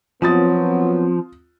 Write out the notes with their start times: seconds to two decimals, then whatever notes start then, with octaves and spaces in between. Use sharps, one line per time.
0.22 F3 F#3 B3 C4 F4 D#6 A6